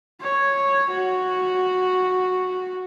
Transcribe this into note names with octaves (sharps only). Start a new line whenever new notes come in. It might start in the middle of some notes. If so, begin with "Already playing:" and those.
C#5
F#4